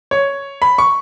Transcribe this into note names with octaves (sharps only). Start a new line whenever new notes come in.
C#5
B5
C#6